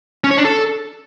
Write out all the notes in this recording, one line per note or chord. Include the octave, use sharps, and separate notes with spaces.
C#4
C#5
D4
A4